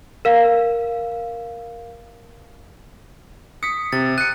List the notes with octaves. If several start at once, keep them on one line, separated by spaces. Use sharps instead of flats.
A#4 F5
D#6 B6 C#7
C3 A6
F#6 C#7 D#7